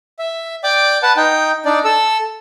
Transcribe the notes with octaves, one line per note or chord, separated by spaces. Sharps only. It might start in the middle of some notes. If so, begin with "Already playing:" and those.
E5
D5 G5 D6
B4 F#5 A5
D#4 G5
D4 D#4 D5
A4 E6